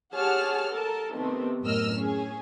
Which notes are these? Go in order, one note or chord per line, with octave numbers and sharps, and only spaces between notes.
G4 G#4 C#5 F#5 A5 F6
A4 A#4 A5
C3 D#3 A3 B3 C4
F#2 A2 A#4 D#5 E6 F6
C#4 G#4